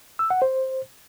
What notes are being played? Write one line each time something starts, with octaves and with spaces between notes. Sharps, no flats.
E6
F#5
C5